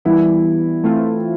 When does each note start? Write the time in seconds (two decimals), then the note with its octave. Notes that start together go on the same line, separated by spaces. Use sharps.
0.05 E3 G3 B3 E4
0.84 E3 A3 C4 F4